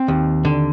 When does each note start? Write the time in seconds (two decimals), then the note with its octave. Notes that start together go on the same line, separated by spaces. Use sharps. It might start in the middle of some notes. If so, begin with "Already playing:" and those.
Already playing: C4
0.08 D#2
0.45 D3